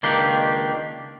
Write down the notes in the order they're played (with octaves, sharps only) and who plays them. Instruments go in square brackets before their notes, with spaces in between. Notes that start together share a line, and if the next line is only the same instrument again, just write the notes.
[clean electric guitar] C#2 D#3 A#3 D4 G4